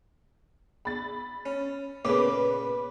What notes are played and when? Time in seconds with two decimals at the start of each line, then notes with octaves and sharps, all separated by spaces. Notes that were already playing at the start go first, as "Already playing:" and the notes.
0.85 B5 A6
1.46 C#4
2.05 A#2 C#3 B3 B4 D6